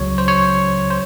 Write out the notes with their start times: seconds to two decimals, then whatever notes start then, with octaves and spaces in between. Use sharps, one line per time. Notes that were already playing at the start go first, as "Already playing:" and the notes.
Already playing: C#2 C#3 F#3 C#5
0.18 C5
0.28 C#5
0.91 C5